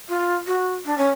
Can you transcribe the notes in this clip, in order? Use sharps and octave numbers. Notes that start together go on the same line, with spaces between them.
F4
F#4
D4
C#4